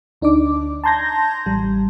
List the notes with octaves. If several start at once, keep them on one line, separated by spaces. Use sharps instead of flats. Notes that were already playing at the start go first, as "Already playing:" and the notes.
D2 D4 D#4 D5 D6
A5 A#5 C6 G6 G#6 A#6
A1 G3